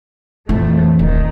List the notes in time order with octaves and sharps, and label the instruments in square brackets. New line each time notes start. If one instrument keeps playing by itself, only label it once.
[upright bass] A#1 E3 [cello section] F2 A3
[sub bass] D#1 [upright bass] D2 [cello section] D#3